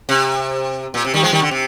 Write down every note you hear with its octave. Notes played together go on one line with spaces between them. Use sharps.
C3
A#2
C3
D#3 G3
F3 G#3
D#3 G3
D3
C3